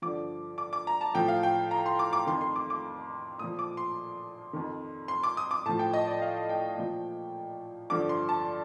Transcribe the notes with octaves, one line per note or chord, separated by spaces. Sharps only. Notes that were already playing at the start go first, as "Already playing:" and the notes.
G2 D3 F3 D6
D6
D6
A#5
A5
A2 F3 G5
F5
G5
A#5
C6
D6
D6
F2 D#3 C6
C6
D6
D6
A#2 F3 D#6
D6
C6
F2 D#3
C6
D6
D#6
D6
A2 F3 A5
G5
D#5
D5
F5
G5
A#2 F3
G2 D3 F3 D6
C6
A5